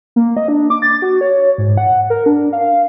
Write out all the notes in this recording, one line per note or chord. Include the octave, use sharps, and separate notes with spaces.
A#3
D#5
D4
D6
A6
F#4
C#5
G#2
F#5
A#4
D4
F5